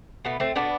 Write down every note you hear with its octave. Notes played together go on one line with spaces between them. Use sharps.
B2 A3 B3
A3 C4
B2 A3 B3 D4